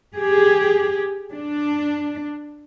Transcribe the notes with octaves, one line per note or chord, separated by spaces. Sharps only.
G4 G#4
D4